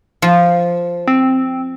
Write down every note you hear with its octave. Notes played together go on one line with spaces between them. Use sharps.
F3
C4